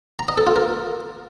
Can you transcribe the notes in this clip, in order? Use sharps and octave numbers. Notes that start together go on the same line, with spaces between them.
A#5
D#5
A4
F4
A#4